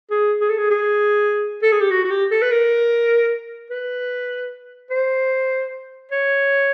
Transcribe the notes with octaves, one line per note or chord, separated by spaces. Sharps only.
G#4
G#4
A4
G#4
G#4
A4
G#4
G4
F#4
F#4
G4
A4
B4
A#4
B4
C5
C#5